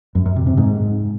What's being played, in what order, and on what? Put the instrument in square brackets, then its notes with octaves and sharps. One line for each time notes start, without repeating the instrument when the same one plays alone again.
[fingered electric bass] F#2
F#2
C3
C3
G#2